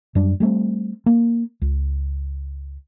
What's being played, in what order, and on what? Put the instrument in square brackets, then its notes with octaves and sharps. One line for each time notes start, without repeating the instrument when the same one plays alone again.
[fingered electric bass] F#2 G3 D4
G3 A3 A#3 C4
A#3
C#2